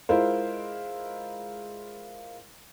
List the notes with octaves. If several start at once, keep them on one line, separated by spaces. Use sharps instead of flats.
G#3 E4 F4 A#4 C5